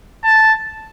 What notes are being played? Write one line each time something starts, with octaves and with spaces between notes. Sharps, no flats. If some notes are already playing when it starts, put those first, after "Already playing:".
A5